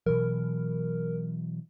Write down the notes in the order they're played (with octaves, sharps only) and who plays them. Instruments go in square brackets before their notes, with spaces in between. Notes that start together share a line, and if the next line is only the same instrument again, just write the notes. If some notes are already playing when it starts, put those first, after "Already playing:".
[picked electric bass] B2 E3 F#3 [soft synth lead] A#4